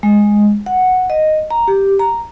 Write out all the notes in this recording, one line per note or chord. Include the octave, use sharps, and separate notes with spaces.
G#3
F#5
D#5
A#5
G4
A#5